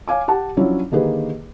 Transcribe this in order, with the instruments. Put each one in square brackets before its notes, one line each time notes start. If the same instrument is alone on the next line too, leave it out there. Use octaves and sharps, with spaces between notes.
[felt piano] C#5 F5 G#5 D6
G4 F#5 A5
F3 F#3 C#4 D4 E4 C#5
D3 D#3 A#3 G4 G#4 B4